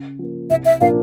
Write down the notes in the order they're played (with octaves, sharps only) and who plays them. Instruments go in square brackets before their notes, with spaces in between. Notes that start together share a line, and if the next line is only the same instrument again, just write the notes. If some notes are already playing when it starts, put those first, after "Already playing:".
Already playing: [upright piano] C#3
F3 A#3
[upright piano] C2 [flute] E5
[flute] E5
[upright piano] A#2 F3 A#3 D4 [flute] F5